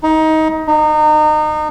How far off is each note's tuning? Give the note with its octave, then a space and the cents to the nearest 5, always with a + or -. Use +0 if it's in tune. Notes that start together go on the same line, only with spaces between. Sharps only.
D#4 +20
D#4 -30